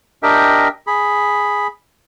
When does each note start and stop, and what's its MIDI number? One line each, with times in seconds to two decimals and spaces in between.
0.23 0.68 62
0.23 0.68 67
0.23 0.68 70
0.23 0.68 75
0.23 0.68 76
0.23 0.68 79
0.87 1.67 68
0.87 1.67 83